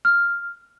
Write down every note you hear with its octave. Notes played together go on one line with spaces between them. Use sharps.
F6